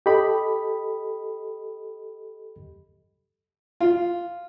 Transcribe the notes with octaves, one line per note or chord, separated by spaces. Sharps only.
G4 A4 D#5 B5
F4